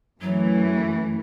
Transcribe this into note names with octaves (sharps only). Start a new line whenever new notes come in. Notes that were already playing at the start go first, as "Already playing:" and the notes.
F#2 E3 F#3 A3